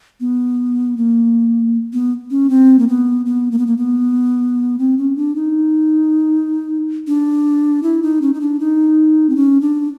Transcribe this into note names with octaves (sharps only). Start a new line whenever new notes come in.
B3
A#3
B3
C#4
C4
A#3
B3
B3
A#3
B3
A#3
B3
C4
C#4
D4
D#4
D4
E4
D#4
C#4
D#4
D4
D#4
C4
C#4
D4